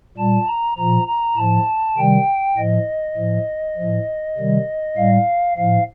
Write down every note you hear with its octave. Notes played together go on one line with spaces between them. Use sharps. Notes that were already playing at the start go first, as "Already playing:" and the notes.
A#2 G3 A5
A#5
A#2 F3 A#5
A#5
A2 F3 A5
C3 D#3 G3 G5
A2 F3 D#5
A2 F3
F3
A2
C3 D#3 G3
A2 G3 F5
A2 F3 F5